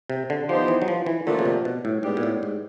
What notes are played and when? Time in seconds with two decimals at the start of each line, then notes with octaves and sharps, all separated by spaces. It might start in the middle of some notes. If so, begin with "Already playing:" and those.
0.10 C3
0.30 D3
0.49 F3 B3 D#4 G4 C5
0.68 E3
0.82 F#3
0.88 F3
1.06 E3
1.26 A#2 D3 F3 A3 D4 F#4
1.39 C#3
1.45 C3
1.65 B2
1.85 A2
2.03 G#2 B3 D4 G4
2.17 A#2
2.23 A2
2.43 G#2